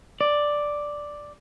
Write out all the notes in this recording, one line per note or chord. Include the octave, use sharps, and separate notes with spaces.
D5